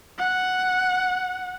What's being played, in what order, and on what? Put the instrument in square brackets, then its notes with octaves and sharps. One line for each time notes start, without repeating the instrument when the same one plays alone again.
[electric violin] F#5